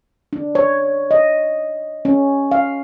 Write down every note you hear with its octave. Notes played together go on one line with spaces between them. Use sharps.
D4
C#5
D#5
C#4
F5